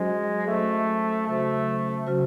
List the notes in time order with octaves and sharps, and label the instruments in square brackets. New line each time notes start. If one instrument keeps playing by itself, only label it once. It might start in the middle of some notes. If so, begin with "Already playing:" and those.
Already playing: [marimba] F#3 C#4 F#4 C5 [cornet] G#3
[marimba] F#3 C#4 F#4 C5 [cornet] A3
[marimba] C#3 F#3 C#4 F#4 C5 [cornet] A3
[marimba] C#3 F#3 C#4 F#4 C5